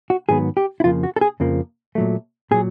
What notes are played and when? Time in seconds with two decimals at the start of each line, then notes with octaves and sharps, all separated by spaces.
0.10 F#4
0.29 G#2 D#3 F#3 B3 G#4
0.57 G4
0.80 E4
0.84 F2 C#3 F3 A#3 F4
1.03 F#4
1.16 A4
1.21 G#4
1.40 F2 C#3 F3 A#3
1.95 A#2 F#3 A3
2.51 A#2 F#3 G#4